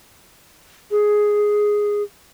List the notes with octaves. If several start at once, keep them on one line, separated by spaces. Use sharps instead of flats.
G#4